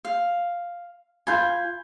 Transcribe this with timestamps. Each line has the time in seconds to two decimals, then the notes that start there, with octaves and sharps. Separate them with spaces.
0.05 F5
1.27 F4 G#5 B5 G6